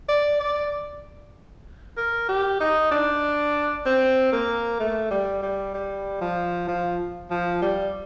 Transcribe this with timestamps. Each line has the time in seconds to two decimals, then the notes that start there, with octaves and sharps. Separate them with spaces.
0.09 D5
0.41 D5
1.97 A#4
2.29 G4
2.61 D#4
2.91 D4
3.86 C4
4.33 A#3
4.80 A3
5.11 G3
5.43 G3
5.74 G3
6.21 F3
6.68 F3
7.31 F3
7.62 G3